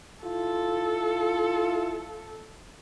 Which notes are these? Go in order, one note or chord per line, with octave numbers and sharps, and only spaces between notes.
E4 F4 A4